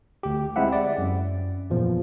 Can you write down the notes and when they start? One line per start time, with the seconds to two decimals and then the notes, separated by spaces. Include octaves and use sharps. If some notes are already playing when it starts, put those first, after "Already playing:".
0.23 D2 G4
0.56 G#3 C4 E4 E5 F#5
0.73 D5
0.98 F#2
1.70 E2 A#2 F3